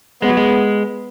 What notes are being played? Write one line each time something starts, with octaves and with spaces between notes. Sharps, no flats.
G#3 B3
F#3
G#3